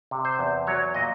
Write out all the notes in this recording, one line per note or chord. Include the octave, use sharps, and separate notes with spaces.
C3
C5
E2
F#3 C#5
A#2 D#5